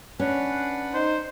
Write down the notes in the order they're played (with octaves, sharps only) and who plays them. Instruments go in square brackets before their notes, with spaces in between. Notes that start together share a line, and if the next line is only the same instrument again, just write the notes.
[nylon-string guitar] C#4 [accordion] D4 B4 F#5
[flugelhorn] D#4 [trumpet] C5